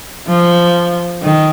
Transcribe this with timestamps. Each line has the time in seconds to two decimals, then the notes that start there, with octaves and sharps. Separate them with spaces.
0.28 F3
1.22 D#3